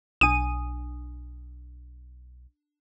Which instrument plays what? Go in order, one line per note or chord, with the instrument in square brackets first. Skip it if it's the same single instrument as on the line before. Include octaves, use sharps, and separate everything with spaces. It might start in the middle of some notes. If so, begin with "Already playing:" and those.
[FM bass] B1 [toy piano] D4 D#6 [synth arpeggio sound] D#7